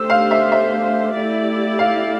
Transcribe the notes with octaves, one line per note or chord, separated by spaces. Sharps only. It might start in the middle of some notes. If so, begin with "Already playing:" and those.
Already playing: A3 D4 G4 C5 E6
F5
E5
E5
A3 E4 G4 D5
F5